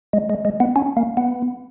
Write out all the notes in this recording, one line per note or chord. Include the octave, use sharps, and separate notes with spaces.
G#3
G#3
G#3
B3
C#4
A#3
B3